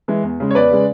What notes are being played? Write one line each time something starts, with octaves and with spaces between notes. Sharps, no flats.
E3 G#3
E2
C#3 G#3
C#5
E2 B4 D5
C#3 G#3